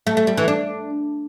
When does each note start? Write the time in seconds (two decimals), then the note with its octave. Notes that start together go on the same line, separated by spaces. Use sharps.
0.07 A3
0.17 A3
0.27 G3
0.37 E3
0.48 D4